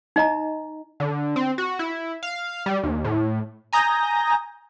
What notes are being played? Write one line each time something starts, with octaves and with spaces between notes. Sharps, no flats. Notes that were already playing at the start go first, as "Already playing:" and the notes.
D#4 D#5 A#5
D3
C4
F#4
E4
F5
G3
D#2
A2
G#5 A#5 D#6 G6 A#6